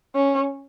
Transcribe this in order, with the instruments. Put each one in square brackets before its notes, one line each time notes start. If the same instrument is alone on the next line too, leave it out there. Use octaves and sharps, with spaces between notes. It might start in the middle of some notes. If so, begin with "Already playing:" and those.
[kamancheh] C#4